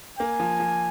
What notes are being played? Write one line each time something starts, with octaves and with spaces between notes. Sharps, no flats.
A#3 G#5
F3
F3